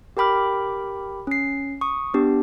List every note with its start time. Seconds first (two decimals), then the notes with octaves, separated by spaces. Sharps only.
0.17 G4 A#4 G5 B5 D6 F6
1.27 C#4 C7
1.81 C#6 D#6
2.14 B3 D4 G4